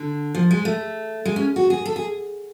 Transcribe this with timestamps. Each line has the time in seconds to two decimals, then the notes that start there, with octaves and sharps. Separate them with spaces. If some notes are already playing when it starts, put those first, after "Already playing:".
Already playing: D3
0.35 F3
0.51 G#3
0.65 A3
1.25 G#3
1.36 C#4
1.56 F#4
1.70 G#4
1.85 A4
1.96 G#4